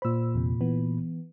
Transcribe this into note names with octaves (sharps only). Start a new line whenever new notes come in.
A#2 C5 B5 E6
E2 C3
E3 B3